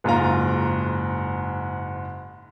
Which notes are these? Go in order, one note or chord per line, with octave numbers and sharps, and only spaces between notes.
F#1 G#2 F4 A#5